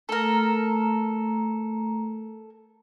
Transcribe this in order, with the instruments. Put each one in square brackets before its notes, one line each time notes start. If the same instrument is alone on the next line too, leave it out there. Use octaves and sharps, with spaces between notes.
[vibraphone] A3 A#5 [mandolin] A4 A#4